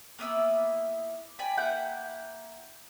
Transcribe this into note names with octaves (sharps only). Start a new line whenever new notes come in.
A#3 B3 E4 E6
D5 G5 G#5 B5
A#3 E4 F#5 G6